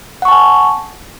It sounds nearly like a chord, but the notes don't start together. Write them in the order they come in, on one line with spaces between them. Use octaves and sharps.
F#5 C#6 A5 G#5